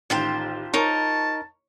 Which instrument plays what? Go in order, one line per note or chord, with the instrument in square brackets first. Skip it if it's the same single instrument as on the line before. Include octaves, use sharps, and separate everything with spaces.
[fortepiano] A1 D#3 [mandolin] F4 G4 C5
[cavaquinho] D#4 A#4 [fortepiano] C#5 [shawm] A5